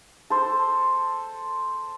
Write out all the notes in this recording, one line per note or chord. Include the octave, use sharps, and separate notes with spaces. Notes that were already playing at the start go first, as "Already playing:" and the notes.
A4 C5